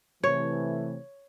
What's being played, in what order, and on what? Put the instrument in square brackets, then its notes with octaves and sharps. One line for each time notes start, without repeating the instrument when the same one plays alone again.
[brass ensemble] C3 E3 A3 [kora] C#5